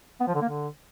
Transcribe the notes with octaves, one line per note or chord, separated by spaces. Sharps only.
B3
F3
D3
A#3
D3